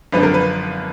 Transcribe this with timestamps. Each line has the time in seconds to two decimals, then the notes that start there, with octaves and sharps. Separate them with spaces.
0.12 G#1 F#2 D3 F3 B4
0.23 A#4
0.34 B4